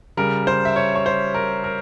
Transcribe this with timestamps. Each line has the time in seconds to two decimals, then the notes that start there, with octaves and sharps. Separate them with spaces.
0.17 C#3 G3 A#4
0.47 C5
0.65 E5
0.76 C#5
0.96 C#5
1.06 C5
1.34 A#4
1.64 A#4